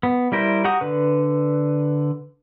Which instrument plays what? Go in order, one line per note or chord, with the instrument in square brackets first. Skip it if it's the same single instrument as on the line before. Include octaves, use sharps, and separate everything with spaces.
[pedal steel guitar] B3
G3 E4 A#4 C5
F#4 G4 F#5 A#5 D#6
D3 B4